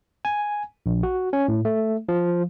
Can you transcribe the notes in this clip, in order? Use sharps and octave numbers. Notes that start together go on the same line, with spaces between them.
G#5
A#1
F#4
C#4
A2
A3
F3